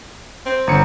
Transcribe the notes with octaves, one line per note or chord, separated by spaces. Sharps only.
C4
G1 A#5 C#7